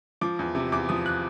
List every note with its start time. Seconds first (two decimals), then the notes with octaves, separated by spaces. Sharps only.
0.21 F3 D6
0.39 E2
0.55 C3
0.72 E2 D6
0.89 F3 D#6
1.06 F#6